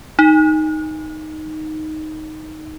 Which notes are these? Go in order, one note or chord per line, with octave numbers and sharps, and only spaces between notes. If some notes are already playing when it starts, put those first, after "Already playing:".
D#4